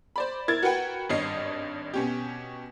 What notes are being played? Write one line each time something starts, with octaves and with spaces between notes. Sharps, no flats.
C5 D5 B5
E4 A#4 G#6 A6
F#4 A#4 B4 F#5 G5
G#1 G2 C#5 D#5 C7
B2 C#4 G4